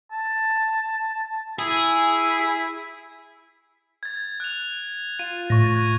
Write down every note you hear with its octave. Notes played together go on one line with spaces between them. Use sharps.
A5
E4 G#4
G#6 A6
F#6 F7
F4 D#7
A2 C#6 A6 A#6
C#6 F#6 G#6